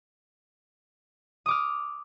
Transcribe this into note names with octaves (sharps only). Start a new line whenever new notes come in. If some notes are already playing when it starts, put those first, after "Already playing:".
D6 D#6 F6